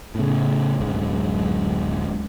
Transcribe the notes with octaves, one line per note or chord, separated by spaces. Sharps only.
A2 C#3
D1 F#2 G#3